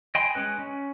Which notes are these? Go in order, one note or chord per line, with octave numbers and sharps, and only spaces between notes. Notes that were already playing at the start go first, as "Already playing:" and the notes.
D#5 G5 G#5 B5 C6
G#3 C#4 B4
C#4